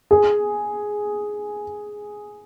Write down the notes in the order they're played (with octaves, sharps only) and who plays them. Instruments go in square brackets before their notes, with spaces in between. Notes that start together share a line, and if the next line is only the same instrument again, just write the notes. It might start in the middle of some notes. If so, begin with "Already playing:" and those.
[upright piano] G#4